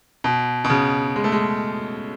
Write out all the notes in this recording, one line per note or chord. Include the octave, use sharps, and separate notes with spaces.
B2
B2
C#3
G#3
A3
G#3